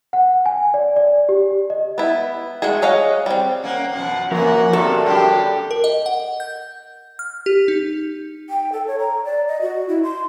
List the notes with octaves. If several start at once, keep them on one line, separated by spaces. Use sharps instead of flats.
F#5
G#5
D5
D5
G4
D#5
B3 E4
G#3 A3 F#4 G#4
G#4 C#5 D#5 F5 F#5
G3 C4
A#3 C#4 F#5
F#2 B2 F3 F#5
E3 F3 A#3 F#4 A#4 C#5 F#5
C3 F#4 A4 A#4 D5
F#3 G3 D4 G4
A#4
D#5
F#5
G6
F6
G4
D#4
G5
A4
C#5
A#5
D5
D#5
F#4
E4
C6